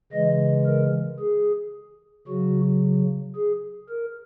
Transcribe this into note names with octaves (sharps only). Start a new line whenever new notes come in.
C#3 E3 G#3 D#5
A#4
G#4
C#3 F#3 F#4
G#4
A#4